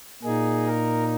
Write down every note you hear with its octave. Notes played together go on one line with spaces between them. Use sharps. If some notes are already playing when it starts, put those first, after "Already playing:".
A#2 A#3 D#4 G#4
A#4